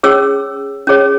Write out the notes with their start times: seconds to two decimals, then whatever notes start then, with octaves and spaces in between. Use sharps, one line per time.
0.03 C#4 G#4 C#5 E6
0.87 C#4 G#4 C#5